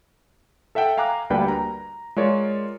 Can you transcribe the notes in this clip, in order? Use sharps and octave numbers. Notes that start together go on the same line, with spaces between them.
A4 E5 F#5 G5 A5
F5 G#5 A#5 D6 F#6
D2 G3 A#3 D4 B4 G5
A#5
G#3 F4 A#4 C#5 D5